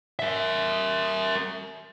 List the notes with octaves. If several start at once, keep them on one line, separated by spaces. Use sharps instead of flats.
A#4 E5